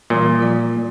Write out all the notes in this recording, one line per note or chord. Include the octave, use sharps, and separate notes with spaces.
A#2 E3 G3
F3 F4 D5